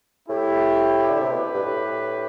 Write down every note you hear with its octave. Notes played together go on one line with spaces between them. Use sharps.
A2 E4 G4
D3
C3 G4 B4
B2
G2
A2